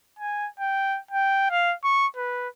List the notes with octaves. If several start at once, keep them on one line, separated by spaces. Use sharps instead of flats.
G#5
G5
G5
F5
C#6
B4